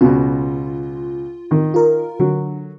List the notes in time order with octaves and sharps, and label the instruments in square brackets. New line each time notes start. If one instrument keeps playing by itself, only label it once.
[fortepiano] C#2 B2 [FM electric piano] F4
[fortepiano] D#3
[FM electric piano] F4 A#4
[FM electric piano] D3 [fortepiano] F#3